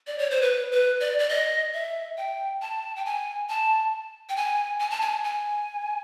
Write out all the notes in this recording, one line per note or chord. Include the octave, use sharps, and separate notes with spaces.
D5
C#5
C5
B4
B4
D5
D5
D#5
E5
G5
A5
G5
G#5
A5
G5
G#5
G#5
A5
G#5
G#5